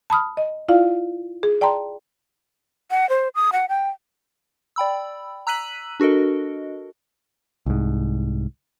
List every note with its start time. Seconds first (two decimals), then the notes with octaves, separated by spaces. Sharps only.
0.10 A5 B5 D#6 F6
0.37 D#5
0.68 E4 F4 D5 F5
1.43 G#4
1.61 D5 G5 A5 A#5 C6
2.91 F#5
3.09 C5
3.35 D#6
3.53 F#5
3.69 G5
4.76 D5 G5 B5 E6
5.47 A#5 E6 F#6 B6 D#7 F#7
6.00 D4 F#4 A4 A#4 D#5
7.66 C2 G#2